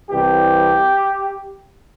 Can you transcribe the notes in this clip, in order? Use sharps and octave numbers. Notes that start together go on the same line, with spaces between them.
C2 C3 E3 G4